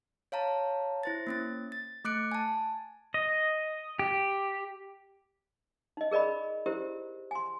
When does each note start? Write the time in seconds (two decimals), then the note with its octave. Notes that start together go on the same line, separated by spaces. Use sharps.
0.32 C#5 F5 A5 A#5
1.03 E4 C5 A6
1.27 A#3 C#4 A6
1.72 A6
2.05 A3 D6 F#6 C#7 D7
2.32 G#5 A5
3.14 D#5
3.99 G4
5.97 D#4 D#5
6.11 G#4 A#4 D5 D#5 B5
6.66 E4 G4 A#4 C5
7.31 G#5 C6